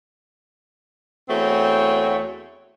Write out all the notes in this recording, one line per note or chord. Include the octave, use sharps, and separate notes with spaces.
E2 A3 C4 F#4 C#5